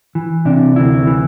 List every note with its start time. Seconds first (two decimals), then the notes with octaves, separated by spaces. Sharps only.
0.15 E3
0.45 C3 D4
0.76 D2 E4
1.07 E3